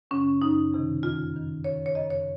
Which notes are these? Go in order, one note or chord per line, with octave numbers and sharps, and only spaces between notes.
F#2 C#3 C#4
F#2 C#3 D#4
F2 C3 D#3
F2 C3 D#3 F4
F#2 D#3
F#2 D#3 C#5
C#5
F#2 C#3 D#5
C#5